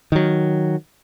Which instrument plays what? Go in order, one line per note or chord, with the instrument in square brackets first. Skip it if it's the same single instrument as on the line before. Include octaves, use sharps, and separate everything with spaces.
[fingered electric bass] D#3 F#3